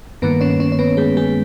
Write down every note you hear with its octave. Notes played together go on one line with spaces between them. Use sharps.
G2 D#3 A#3 B3 B4
C#4 C#5
C#4 C#5
C#5
B3 B4
G#3 G#4
G#3 G#4